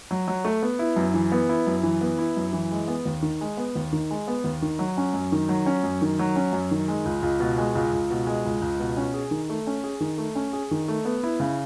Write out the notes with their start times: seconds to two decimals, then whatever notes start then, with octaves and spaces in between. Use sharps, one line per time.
0.11 F#3
0.28 F#3
0.44 A3
0.62 B3
0.79 E4
0.96 F#2
1.14 E3
1.32 B3
1.49 E4
1.67 F#2
1.83 E3
2.01 B3
2.18 E4
2.37 F#2
2.53 E3
2.71 G#3
2.88 B3
3.05 D#2
3.22 D#3
3.41 G#3
3.57 B3
3.75 D#2
3.92 D#3
4.11 G#3
4.28 B3
4.44 D#2
4.62 D#3
4.79 F#3
4.97 C#4
5.14 F#2
5.32 D#3
5.49 F#3
5.66 C#4
5.84 F#2
6.02 D#3
6.19 F#3
6.36 C#4
6.53 F#2
6.71 D#3
6.88 G#3
7.05 C#2
7.23 C#2
7.40 B2
7.58 G#3
7.75 C#2
7.93 C#2
8.10 B2
8.27 G#3
8.45 C#2
8.61 C#2
8.80 B2
8.97 C#4
9.14 G#4
9.31 D#3
9.50 A3
9.67 C#4
9.84 G#4
10.00 D#3
10.18 A3
10.35 C#4
10.53 G#4
10.71 D#3
10.88 A3
11.05 B3
11.23 E4
11.40 C#3